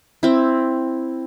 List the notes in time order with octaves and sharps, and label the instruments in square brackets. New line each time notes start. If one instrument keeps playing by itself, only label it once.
[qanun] C4 E4